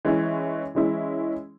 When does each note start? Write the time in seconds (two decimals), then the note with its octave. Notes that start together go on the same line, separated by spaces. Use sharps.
0.05 E3 G#3 C#4 E4
0.75 E3 G#3 C#4 E4